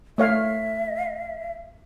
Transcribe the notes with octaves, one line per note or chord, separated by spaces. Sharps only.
A3 C#5 E5 F5